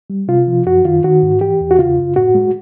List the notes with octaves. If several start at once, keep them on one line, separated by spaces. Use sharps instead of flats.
G3
C3 F4
F3
F#2 F#4
D#3 F4
D#3 F#4
G#2
E3 G4
E2
F#4
C#3 F4
F#2
A2 F#4
G#3